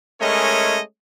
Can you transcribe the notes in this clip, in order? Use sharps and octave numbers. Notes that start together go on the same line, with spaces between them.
G#3 A3 C#4 A#4 C#5 D#5